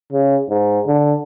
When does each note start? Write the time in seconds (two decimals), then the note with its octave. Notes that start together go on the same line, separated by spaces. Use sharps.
0.12 C#3
0.50 G#2
0.87 D3